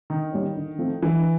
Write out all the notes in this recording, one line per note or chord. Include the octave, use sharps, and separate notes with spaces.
D3 D#3
G3 A#3 C#4
D3
F3 A3 C4
D3 E3